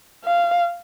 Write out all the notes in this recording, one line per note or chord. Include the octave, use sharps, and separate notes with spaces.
F5